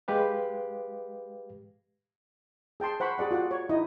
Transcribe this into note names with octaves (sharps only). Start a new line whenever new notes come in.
G#3 G4 B4 F5
G#4 G5 A5 C6
C5 F#5 B5 C#6
G4 G#4 D5 F#5
F4 F#4 D5 F#5
C#5
D#4 E4 D#5